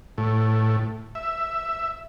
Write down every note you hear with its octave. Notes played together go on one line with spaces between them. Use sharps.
A2
E5